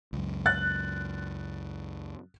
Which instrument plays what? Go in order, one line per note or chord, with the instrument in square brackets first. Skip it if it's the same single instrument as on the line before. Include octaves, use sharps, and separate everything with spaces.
[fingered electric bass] C#2 F#2
[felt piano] F#6 A6